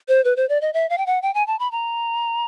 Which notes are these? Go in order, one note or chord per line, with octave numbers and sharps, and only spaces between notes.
C5
B4
C5
D5
D#5
E5
F5
G5
F#5
G5
G#5
A5
B5
A#5